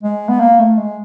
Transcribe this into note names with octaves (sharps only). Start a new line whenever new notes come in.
G#3
B3
A#3
A3
G#3